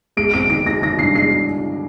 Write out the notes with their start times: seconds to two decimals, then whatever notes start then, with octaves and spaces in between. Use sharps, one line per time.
0.17 G#3 D7
0.33 C4 D7
0.50 D#3 D7
0.66 G#3 A#6
0.83 D#3 A#6
0.99 G2 C7
1.15 G#3 C7